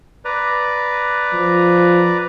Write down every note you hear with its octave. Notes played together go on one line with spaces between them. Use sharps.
B4 D5 A#5
F3